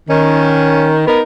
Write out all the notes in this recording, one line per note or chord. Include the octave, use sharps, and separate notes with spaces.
D#3 C#4
B3 D#4 A#4